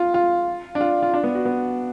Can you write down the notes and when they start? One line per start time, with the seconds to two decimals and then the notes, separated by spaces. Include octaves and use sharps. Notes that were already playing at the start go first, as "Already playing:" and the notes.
Already playing: F4
0.14 F4
0.75 D4
0.81 F4
1.03 F4
1.14 D4
1.24 B3
1.35 F#4
1.45 B3